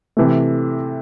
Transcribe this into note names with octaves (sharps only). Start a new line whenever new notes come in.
C3 E3 A3